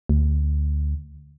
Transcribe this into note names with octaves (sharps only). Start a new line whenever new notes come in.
D2